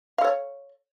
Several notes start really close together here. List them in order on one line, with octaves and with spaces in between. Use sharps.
F5 A4 C#5